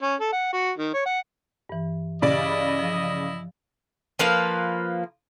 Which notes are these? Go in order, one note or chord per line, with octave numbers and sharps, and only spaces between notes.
C#4
A4
F#5
F#4
D#3
C#5
F#5
G2 E3
G2 C#3 E4 G4 D5 D#5 B5
F3
F3 A#3 B4 F5